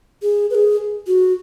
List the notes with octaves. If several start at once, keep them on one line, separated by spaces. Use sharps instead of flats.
G#4
B4
G#4
F#4